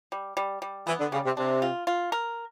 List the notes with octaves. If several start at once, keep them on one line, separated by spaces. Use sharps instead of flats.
G3
G3
G3
E3 B3
D3
C#3 G3
C3
C3 D4
F4
F4
A#4